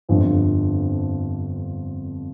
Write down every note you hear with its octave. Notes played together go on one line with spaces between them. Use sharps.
G1 F2 D3 F3 C4